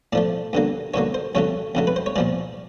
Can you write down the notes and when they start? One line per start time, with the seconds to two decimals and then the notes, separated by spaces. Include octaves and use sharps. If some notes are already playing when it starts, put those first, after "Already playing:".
0.13 A2 F3 A3 D5
0.53 G2 D3 F#3 A#3
0.94 G2 D3 F#3 A#3 C#5
1.14 C5
1.35 F2 C#3 F#3 A3 C#5
1.75 F2 C#3 F#3 A3
1.87 B4
1.96 C5
2.06 C#5
2.16 A#2 F3 G#3 D5